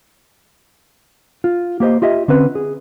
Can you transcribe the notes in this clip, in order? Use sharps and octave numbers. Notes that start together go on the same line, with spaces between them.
F4
A#3 G4 C5 D#5
F4 G4 D#5 E5
D3 C4 C#4 B4
G#4